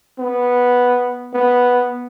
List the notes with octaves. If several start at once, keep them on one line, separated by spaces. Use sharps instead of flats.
B3
B3